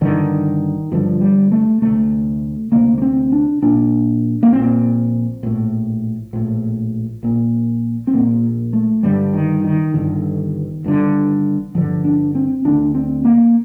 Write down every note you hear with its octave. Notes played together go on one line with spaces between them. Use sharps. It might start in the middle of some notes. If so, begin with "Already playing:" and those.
G1 G2 D3 D#3
G1 G2 D3 F3
G3
A3
D2 C3 A3
D2 C3 A#3
A#3
C4
D4
A#1 A#2 D4
A#3
A#1 A#2 C4
A#1 A2
A#1 A2
A#1 A#2
C4
A#1 A#2 A#3
A3
G1 G2 D3 G3
D#3
D#3
G1 G2 D3 D#3
G1 G2 D3
G1 G2 D3 F3
D4
C4
D2 D3 D4
C4
A#3